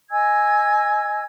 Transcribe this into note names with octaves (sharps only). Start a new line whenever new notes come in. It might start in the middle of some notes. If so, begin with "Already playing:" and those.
D#5 G#5 E6 G#6